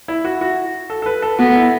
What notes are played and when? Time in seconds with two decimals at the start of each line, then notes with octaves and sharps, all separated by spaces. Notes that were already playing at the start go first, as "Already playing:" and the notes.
0.08 E4
0.25 F#4
0.41 F#4
0.90 A4
1.02 A4
1.06 B4
1.22 A4
1.39 B3 F#4
1.55 E4